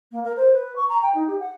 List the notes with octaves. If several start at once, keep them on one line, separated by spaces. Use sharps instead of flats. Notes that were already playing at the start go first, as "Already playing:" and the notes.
A#3
A#4
C5
B4
C#6
A#5
G5
D#4
G4
F#5